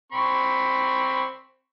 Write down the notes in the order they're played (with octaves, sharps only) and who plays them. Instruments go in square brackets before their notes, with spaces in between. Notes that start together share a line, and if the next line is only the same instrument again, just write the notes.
[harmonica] C4 B5 C#6